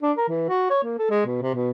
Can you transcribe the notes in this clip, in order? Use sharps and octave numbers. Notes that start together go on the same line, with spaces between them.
D4
A#4
E3
F#4
C#5
A#3
A4
G#3
B2
C3
B2